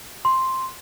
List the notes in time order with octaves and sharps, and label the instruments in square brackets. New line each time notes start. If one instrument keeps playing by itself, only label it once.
[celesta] C6